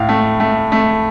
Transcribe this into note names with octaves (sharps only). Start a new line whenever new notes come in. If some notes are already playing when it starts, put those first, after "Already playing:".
Already playing: A2 F5
A3
A3
A3